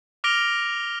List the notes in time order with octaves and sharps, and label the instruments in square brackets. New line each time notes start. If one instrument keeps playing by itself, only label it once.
[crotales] D6 F6 A#6 D7 F7 G7